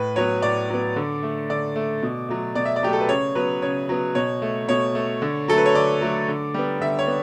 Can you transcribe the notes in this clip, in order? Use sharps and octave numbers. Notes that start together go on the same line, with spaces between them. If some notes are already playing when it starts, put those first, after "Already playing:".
Already playing: A2 B4
F#3 B3 C#5
A2 D5
F#3 B3
D3
A3
D3 D5
A3
B2
F#3 A3
B2 D5
E5
D5
F#3 A3 G4
A4
B4
C#3 C#5
F#3 B3 B4
C#3 C#5
F#3 B3
B2 C#5
A3
B2 C#5
A3
D3
F#3 A3 A4
B4
C#5
D3 D5
F#3 A3
D3
G3 B3
D3 E5
C#5
B3